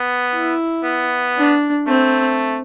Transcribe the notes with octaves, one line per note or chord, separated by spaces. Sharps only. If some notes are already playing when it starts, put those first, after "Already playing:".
Already playing: B3
E4
B3
D4
A3 C4